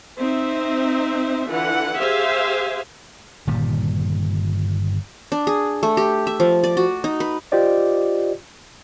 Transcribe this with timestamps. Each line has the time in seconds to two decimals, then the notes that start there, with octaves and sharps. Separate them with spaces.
0.18 C4 D#4 C5 E5
1.49 D3 E3 F4 F#5
1.98 G4 G#4 C5 E5 F5 G#5
3.47 G1 A#2 D#3 G3
5.32 D4
5.47 G#4
5.83 A3
5.97 G4
6.27 E5
6.40 F3
6.64 D5
6.77 F#4
7.04 D#4
7.20 B4
7.52 F4 G4 C5 D5 D#5